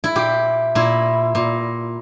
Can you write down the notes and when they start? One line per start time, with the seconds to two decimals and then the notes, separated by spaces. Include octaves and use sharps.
0.04 E4
0.15 A#2 G4
0.75 A#2 E4
1.35 A#2